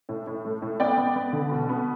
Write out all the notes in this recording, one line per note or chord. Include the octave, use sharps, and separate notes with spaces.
A2
A2
A3
A2
B3 D5 G5
B3
B3
D3
B2
B3